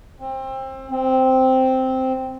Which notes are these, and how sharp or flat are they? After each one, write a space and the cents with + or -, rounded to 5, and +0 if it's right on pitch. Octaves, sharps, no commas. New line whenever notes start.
C4 +25
C4 -5